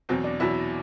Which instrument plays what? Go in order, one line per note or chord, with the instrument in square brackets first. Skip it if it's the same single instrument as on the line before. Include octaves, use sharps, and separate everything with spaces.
[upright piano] E2 B2 F#3 C4
D4
E2 B2 F#3 E4